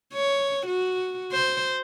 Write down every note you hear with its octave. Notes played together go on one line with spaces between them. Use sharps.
C#5
F#4
C5